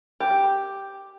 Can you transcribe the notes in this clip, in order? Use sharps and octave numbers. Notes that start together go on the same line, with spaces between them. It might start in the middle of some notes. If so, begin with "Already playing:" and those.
G4